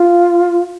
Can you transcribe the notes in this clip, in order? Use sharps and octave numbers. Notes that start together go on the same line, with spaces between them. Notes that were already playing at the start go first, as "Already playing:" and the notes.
Already playing: F4